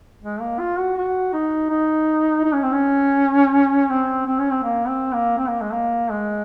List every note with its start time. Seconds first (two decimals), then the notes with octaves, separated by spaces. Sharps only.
0.22 G#3
0.41 A#3
0.59 F4
0.78 F#4
0.97 F#4
1.33 D#4
1.70 D#4
2.44 D#4
2.53 C#4
2.63 C4
2.72 C#4
3.90 C4
4.26 C4
4.39 C#4
4.51 C4
4.63 A#3
4.88 C4
5.13 A#3
5.38 C4
5.49 A#3
5.61 G#3
5.73 A#3
6.11 G#3